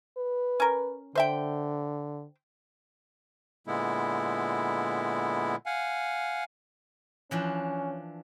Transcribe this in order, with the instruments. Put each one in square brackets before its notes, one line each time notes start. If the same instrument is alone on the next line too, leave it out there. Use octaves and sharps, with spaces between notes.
[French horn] B4
[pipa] C#4 A#4
[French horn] D3 [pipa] C5 E5 G5
[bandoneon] A#2 D3 G#3 B3 E4
F5 F#5 G#5
[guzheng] E3 F3 D4 [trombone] C#4